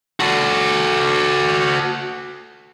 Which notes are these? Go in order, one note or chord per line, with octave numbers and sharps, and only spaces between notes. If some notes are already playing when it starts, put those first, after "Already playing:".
F#4 A4